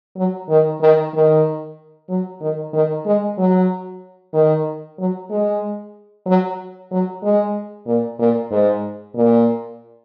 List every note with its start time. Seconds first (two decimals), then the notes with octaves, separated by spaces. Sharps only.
0.17 F#3
0.49 D#3
0.81 D#3
1.13 D#3
2.09 F#3
2.41 D#3
2.73 D#3
3.06 G#3
3.38 F#3
4.33 D#3
4.99 F#3
5.30 G#3
6.26 F#3
6.91 F#3
7.23 G#3
7.87 A#2
8.19 A#2
8.51 G#2
9.15 A#2